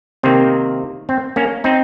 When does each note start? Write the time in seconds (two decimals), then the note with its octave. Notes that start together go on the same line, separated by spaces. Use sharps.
0.23 C3 D#3 A#3 C4
1.09 C4
1.36 A#3 C#4
1.64 C4 D#4